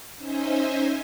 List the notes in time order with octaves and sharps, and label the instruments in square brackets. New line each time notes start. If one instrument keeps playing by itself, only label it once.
[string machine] C#4 D#4 C5 D#5 E5 G#5